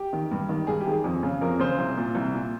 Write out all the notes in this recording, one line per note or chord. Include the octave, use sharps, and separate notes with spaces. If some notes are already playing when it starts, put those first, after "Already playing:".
Already playing: G4
D#3
G2
D#3
G2 G#4
G4
D#3 G#4
F2
C#3
F2 A#4
C#3 C5
C2
A#2
C2
A#2